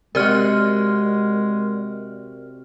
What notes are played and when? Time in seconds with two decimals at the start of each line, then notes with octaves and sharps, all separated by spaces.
0.15 C3 G#3 F#4 A#4 D5 F6